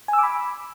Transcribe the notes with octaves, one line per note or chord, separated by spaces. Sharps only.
G#5 B5 D6 E6